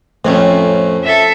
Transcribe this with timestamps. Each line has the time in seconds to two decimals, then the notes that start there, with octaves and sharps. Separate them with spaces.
0.25 F2 A2 A3 C4 C#4 F4
1.04 A4 E5